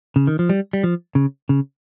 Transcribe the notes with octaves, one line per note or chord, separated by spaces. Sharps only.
C#3
D#3
F3
G3
G3
F3
C#3
C#3